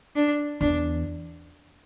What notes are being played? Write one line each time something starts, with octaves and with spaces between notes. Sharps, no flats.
D4
E2 D4